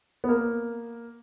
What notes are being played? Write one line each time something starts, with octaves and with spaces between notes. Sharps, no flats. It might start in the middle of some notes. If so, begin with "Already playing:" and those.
B3
A#3